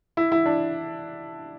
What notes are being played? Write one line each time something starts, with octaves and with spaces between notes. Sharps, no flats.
E4
E4
D4